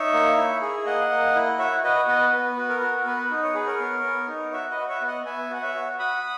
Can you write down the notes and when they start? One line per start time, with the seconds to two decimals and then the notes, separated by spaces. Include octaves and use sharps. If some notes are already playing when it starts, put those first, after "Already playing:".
Already playing: D#4 C#5 E5
0.13 A#3
0.37 E4
0.61 G#4
0.85 A#3 D#5 F#5
1.10 A#3
1.35 E4
1.59 F#4 C#5 E5
1.84 F#4 B4 D#5
2.08 B3 B4 D#5
2.32 B3 B4
2.57 F#4
2.69 A#4
2.81 F#4
3.06 B3 B4
3.30 D#4
3.43 C#5
3.54 G#4 B4
3.66 A#4 C#5
3.80 B3
4.04 B3
4.28 D#4
4.52 F#4 C#5 E5
4.71 B4 D#5
4.77 F#4
4.89 C#5 E5
5.01 B3
5.08 D#5 F#5
5.26 B3 E5 G#5
5.50 F#4 F#5
5.62 C#5 E5
5.74 F#4
5.99 F#4 B5 D#6